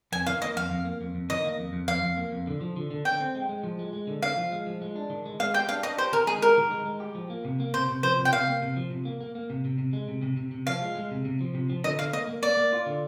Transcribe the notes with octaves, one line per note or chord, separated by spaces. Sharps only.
F2 G#5
D#3 F5
A#3 D#5
F2 F5
F2
A#3
F2
F2
D#3 D#5
A#3
F2
F2
F2 F5
F2
A#3
F2
D3
F3
D3
D3
D3 G5
C4
G#3
G#3
F3
G#3
G#3
D3
D3 F5
F3
G#3
F3
G#3
D4
D#3
G#3
G#3 F5
G4 G5
D4 F5
D4 D#5
G4 C5
D#3 A#4
G#3 G#4
G4 A#4
D#3
G#3
G#3
G4
F3
A#3
C3
A#3
C3 C5
C3
F3 C5
C3
G5
C3 F5
A#3
C3
F3
C3
A#3
A#3
A#3
C3
C3
C3
G#3
C3
C3
C3
C3
F3 F5
G#3
G#3
C3
C3
F3
C3
F3
D3 D#5
D3 F5
A#3 D#5
A#3
A#3 D5
A#3
F4
D3